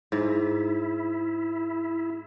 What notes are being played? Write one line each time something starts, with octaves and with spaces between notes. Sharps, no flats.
G#2 E4